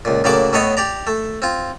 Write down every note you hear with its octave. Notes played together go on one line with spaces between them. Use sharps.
C#2 A#2
A2 C#3 F#3 A#3 D5 D6
A2 A3 B3 C#5 D#5
G4 D5 A#5
A3
C4 F4